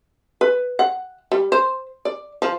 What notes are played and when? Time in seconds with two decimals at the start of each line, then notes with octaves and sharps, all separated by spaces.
0.41 B4
0.79 F#5
1.32 G3
1.52 C5
2.05 D5
2.42 F3